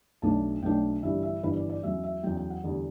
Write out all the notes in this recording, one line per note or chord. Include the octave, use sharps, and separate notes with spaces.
B1 B2 A3 D4 A5
B1 B2 A3 D4 G5
G1 G2 E3 E5
E5
G1 G2 E3 B4
D5
D5
E2 C#3 F#3 E5
E5
E2 C#3 F#3 G5
G5
F#5
E2 D3 G3